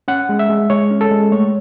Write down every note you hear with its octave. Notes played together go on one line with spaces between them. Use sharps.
C#4 F#5
G#3
E5
G#3
G#3 C#5
C#4
A4
G#3
A3 C#5